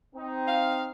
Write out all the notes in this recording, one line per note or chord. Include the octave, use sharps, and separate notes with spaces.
C4 D#4
F5